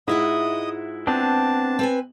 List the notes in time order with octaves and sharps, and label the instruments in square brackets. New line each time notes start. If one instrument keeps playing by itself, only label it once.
[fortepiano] G#2 G#3 E4 [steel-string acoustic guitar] F4 E5 F#5 [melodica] D#5 D#6
[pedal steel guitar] B3 C4 D4 [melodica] A5
[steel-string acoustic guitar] C4 B4 G#5